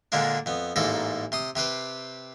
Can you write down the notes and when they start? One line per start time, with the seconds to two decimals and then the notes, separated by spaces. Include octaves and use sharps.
0.12 A#2 D3 G#3 A#3 D4
0.46 F2 B3
0.76 A1 G#2 A#3 A4
1.32 C3 C6 D#6
1.56 C3 G4 B4 C5